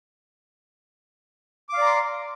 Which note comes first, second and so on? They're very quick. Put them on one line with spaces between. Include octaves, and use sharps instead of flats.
D6 F5 D5 A#5 C6